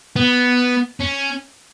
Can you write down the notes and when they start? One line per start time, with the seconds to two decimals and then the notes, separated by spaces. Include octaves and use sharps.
0.16 B3
1.00 C#4